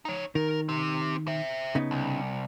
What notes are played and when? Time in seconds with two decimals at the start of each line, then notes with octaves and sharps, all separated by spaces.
0.05 D#4 C#5
0.35 D#3 A#4
0.69 C4 G4
1.27 C5 E5
1.75 C#3 B3 D#4
1.91 C2